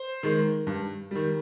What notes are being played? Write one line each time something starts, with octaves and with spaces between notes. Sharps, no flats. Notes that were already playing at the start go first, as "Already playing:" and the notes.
Already playing: C5
D#3 G#3
G2
D#3 G3